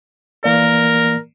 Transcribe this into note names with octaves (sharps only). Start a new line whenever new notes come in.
E3 A#3 A#4 D5